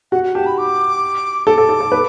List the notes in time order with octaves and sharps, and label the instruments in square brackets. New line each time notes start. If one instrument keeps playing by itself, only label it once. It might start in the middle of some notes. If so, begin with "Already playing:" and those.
[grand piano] F#4 [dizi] F#5
[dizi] F#5
[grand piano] G4 [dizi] A5
[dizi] B5
D6
[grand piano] A4 [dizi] D6
[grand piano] A4
A4
A4
B4